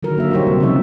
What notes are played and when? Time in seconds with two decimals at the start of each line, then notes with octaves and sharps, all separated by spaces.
0.03 D3 D#3 F#3 A#4
0.16 D3 A#3 E5
0.31 F#3 G3 D#4 G4 C5 C#5
0.47 C3 G3
0.60 C#3 F3 G3 D#4 E5